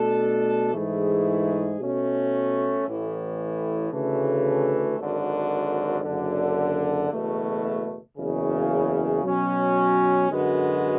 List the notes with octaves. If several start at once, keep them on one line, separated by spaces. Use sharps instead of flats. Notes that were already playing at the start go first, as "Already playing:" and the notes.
Already playing: B2 A3 D4 A4
G#2 E3 A3 E4 G#4
B2 A3 C#4
A1 A2 E3
D2 C#3 E3 A3
G#1 F#2 D3
F#1 F#2 D3
F#1 E2 B2 A3
F#1 E2 C#3
B2 F#3 C#4 F#4
F#2 D3 G#3 B3 F#4